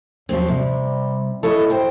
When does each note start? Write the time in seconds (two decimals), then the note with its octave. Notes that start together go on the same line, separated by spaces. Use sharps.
0.29 D#2 F3 F#3 C4
0.48 C3 G3
1.43 E4 A4 C#5 D#5
1.70 C5 G5